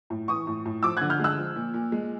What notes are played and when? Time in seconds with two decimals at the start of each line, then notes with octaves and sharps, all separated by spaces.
0.10 A2
0.28 E3 C#6 D#6
0.47 A2
0.65 A2
0.83 F3 D6 E6
0.97 D3 F#6 G#6
1.10 F6 G6
1.19 G#3 E6 F#6
1.38 F3
1.56 A#2
1.74 A#2
1.92 G#3